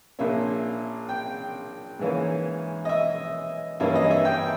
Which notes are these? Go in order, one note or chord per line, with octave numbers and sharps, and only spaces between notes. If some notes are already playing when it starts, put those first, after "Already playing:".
A#1 A#2 A#3 C#4 E5
G5
G#2 E3 A#3 C#4
D#5
E5
G2 E3 A#3 C#4 E5
D#5
E5
G5